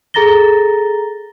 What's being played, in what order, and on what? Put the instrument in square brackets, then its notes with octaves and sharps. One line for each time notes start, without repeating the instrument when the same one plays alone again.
[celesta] G#4 A4 A#5 A6 A#6 G7